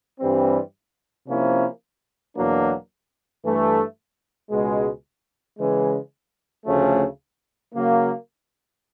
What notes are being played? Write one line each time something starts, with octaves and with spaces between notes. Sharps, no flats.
G2 E3 G3 C4
C3 F3 A#3 C#4 E4
E2 B2 F#3 A#3 D4
G2 E3 A3
C#2 B2 G#3
C#3 E3 G#3
D2 C#3 F3 A3 C#4
C#3 F#3 A#3